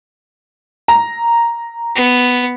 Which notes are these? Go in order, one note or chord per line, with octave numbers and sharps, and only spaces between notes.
A#5
B3